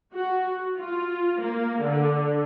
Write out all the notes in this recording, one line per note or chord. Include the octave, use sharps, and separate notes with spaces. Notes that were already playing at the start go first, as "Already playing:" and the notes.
F#4
F4
A#3
D3